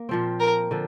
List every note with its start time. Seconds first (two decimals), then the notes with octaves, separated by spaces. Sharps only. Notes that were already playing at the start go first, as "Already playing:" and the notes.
Already playing: A#3
0.09 A#2 F3 C4
0.40 A#4
0.71 D3 F3